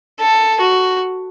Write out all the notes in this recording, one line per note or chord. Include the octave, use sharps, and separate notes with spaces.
A4
F#4